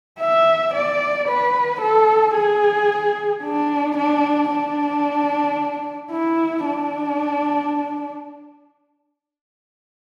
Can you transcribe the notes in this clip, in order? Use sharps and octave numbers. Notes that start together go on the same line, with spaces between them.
E5
D5
B4
A4
G#4
D4
D4
D4
E4
D4